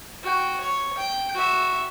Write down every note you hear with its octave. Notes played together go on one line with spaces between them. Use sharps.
F#4 G5
C#5
G5
F#4 E5